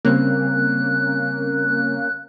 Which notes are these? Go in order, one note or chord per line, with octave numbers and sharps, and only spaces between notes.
C#3 G3 A#3 C4 C#4 F#6